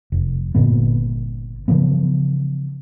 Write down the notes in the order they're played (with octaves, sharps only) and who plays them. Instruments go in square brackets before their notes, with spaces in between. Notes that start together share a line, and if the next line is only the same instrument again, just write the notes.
[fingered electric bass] F1
G1 A#2 D3 B3
C#3 E3 F3 B3